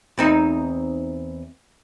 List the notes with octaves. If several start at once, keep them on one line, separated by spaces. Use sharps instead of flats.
E2 C4 D#4